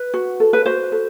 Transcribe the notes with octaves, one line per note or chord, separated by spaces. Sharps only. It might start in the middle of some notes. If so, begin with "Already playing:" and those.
Already playing: B4
F#4
A4
B4
F#4 C5
A4